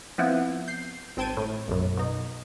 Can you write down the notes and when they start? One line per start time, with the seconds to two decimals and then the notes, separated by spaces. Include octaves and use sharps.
0.18 F3 B3 C4 E4
0.68 G6 C7
1.17 G#1 C4 G5 A5 G#6 D#7
1.37 A2
1.68 B1 F#2
1.97 B2 D#4